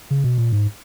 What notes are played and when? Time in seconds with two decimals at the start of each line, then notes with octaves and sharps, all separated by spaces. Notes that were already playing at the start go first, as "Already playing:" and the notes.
0.11 C#3
0.24 B2
0.38 A#2
0.52 G#2